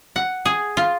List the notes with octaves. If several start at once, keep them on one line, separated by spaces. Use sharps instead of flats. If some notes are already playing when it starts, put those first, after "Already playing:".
F#5
G#4
F4